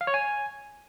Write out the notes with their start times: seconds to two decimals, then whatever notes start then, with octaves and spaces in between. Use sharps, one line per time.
0.01 F5
0.07 C#5
0.14 G#5